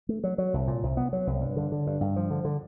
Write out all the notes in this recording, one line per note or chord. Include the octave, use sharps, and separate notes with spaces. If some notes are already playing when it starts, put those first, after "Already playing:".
A3
F#3
F#3
C2
A#2
C2
B3
F#3
C2
G2
D3
D3
G2
G2
F3
D3
D3